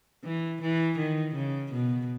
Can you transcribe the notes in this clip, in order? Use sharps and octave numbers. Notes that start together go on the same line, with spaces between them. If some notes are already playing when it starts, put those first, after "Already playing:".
E3
E3
D#3
C#3
B2